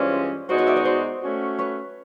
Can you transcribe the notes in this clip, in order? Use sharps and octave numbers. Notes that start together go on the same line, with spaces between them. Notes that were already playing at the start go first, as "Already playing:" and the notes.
Already playing: G2 E3 G#3 C#4 F4 C5 D5
B2 G#3 B3 D#4 F#4 C5 D5
C#5 D#5
D5 E5
C#5 D#5
C5 D5
A3 C#4 F#4
B4 C#5